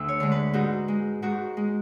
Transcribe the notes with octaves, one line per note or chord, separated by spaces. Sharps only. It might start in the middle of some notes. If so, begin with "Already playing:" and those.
Already playing: D2 E5
C#5
D3 G#3
B4
G#2 F#4
G#3
G#2 F#4
G#3